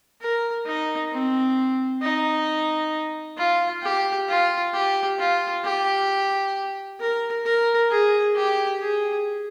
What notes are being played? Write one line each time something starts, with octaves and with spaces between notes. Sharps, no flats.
A#4
D#4
C4
D#4
F4
G4
F4
G4
F4
G4
A#4
A#4
G#4
G4
G#4